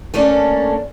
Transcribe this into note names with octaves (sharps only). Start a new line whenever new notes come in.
A3 A#3 C#4 D4